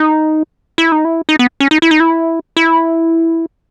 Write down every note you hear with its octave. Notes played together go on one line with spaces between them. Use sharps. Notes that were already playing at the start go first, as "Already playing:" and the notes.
Already playing: D#4
E4
D#4
E4
D#4
B3
C#4
D#4
E4
D#4
E4
E4